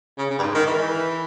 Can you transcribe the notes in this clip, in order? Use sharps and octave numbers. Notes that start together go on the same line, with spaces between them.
C#3
C#3
G2
G#2
D#3
E3